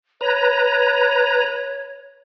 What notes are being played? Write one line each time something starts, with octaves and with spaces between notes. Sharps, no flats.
B4 C#5 A#5